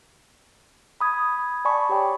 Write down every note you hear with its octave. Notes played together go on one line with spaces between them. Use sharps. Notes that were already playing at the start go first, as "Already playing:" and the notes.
B5 D#6 G#6
D5 G#5 A5 B5 C#6
G4 C#5 G5 C#6 D6